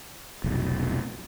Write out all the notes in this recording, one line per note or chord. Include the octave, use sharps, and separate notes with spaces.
F1 B1